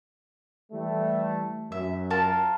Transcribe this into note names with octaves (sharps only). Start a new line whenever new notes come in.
E3 G3 A3
F#2 E5
F4 A#4 A5